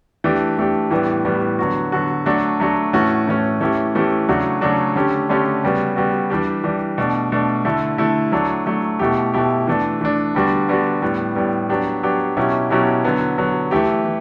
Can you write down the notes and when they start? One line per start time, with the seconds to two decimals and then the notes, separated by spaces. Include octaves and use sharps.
0.24 E3 A3 D4 G4
0.58 E3 A3 D4 G4
0.91 A2 E3 G3 B3
1.25 A2 E3 G3 B3
1.59 D3 F#3 B3 F#4
1.92 D3 F#3 B3 F#4
2.26 F#3 A3 D4 F#4
2.60 F#3 A3 D4 F#4
2.93 A2 E3 A3 C#4 F#4
3.27 A2 E3 A3 C#4 F#4
3.61 E3 A3 C#4 E4 G4
3.95 E3 A3 C#4 E4 G4
4.29 C#3 F#3 A3 D4 F#4
4.61 C#3 F#3 A3 D4 F#4
4.95 D3 A3 C#4 G4
5.29 D3 A3 C#4 G4
5.64 C#3 G3 B3 F#4
5.96 C#3 G3 B3 F#4
6.30 E3 G3 D4 G4
6.64 E3 G3 D4 G4
6.98 B2 A3 D4
7.32 B2 A3 D4
7.65 D3 A3 E4
7.98 D3 A3 E4
8.32 F#3 A3 D4
8.66 F#3 A3 D4
8.99 B2 A3 E4 G4
9.33 B2 A3 E4 G4
9.67 E3 A3 D4
10.01 E3 A3 D4
10.35 D3 G3 B3 D4 F#4
10.69 D3 G3 B3 D4 F#4
11.02 A2 G3 B3
11.35 A2 G3 B3
11.69 F#3 B3 D4 G4
12.03 F#3 B3 D4 G4
12.37 B2 F#3 C#4 E4 G4
12.70 B2 F#3 C#4 E4 G4
13.04 D3 F#3 B3
13.38 D3 F#3 B3
13.71 E3 A3 E4 G4
14.05 E3